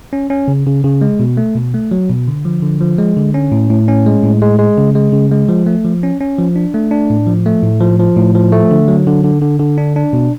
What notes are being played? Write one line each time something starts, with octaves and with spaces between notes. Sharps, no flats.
C#4
C#4
C#3
C#3
C#3
G#3
B2
A3
B2
A3
F#3
B2
D3
F3
D3
F3
G#3
D3
C#4
A2
A2
C#4
G#3
A2
G#3
G#3
C#3
G#3
C#3
G#3
F3
A3
F3
C#4
C#4
F3
D4
A3
D4
A2
F3
A3
A2
F3
F3
A2
F3
A3
D3
F#3
D3
D3
D3
D3
D4
D4
B2